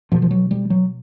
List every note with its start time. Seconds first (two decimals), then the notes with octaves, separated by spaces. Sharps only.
0.12 B2 F3
0.22 F3
0.31 F#3
0.51 G3
0.70 F#3